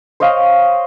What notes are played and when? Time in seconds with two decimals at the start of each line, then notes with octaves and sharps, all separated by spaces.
0.20 C5 C#5 D#5 F5